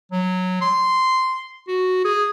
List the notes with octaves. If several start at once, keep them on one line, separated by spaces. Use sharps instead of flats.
F#3
C6
F#4
G#4